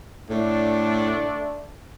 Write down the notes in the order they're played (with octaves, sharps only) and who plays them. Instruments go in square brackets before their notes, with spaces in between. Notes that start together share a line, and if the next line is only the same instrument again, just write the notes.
[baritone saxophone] A2 [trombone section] D3 A3 D4